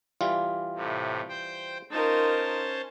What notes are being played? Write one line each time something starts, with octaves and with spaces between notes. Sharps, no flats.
E3 G3 F4
A2 C3
C5 G5
C#4 D#4 F4 A#4 C5 A5